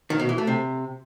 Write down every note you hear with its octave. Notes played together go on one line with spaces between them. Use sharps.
D#3
B2
E3
A3
C3